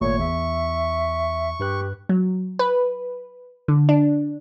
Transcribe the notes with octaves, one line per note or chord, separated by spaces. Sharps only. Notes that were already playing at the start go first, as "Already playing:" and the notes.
G#1 A#2 A3 C#5 C#6
E2 E5
G2 G4 B4 F#6
F#3
B4
D3
D4